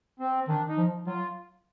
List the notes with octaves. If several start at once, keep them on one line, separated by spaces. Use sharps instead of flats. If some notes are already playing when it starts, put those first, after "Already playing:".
C4
D#3 D4
D#4
F3
F#3 F4